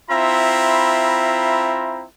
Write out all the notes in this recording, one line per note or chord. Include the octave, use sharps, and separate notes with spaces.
C4 E4 F4 E5 A#5 B5